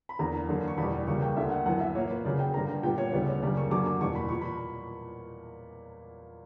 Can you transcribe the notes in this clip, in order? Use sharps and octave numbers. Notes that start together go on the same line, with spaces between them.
B5
E2 D3 A#3 A#5
F#2 D3 A#3
C#6
E2 B2 G3 B5
C#2 C#3 G3 A#3 C#6
G5
D2 D3 A#3 E5
F#5
F#2 E3 B3 F#5
E5
A#2 A#3 C#5
B4
F#2 C#3 F#3 D5
G5
G2 D3 A#3 A#5
A#2 G3 B3 G5
C#5
D2 C#3 G3 B3 D5
C#5
F#2 C#3 G3 A#3 D5
C#6
F#2 D3 F#3 A#3 D6
D6
E2 B2 G3 A#3 C#6
B5
A#2 A#3 C#6
B5